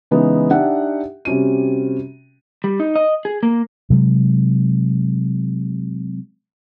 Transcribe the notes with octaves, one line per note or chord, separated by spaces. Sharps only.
C#3 E3 G#3 B3 D#4
D4 D#4 G4 E5 F#5 G5
C3 G3 C#4 F#4 D#7
G3
D#4
D#5
G#4
A#3
C3 F#3 G#3